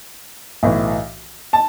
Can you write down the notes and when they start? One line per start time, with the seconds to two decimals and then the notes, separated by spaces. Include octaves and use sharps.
0.63 B1 A2 E3
1.53 A5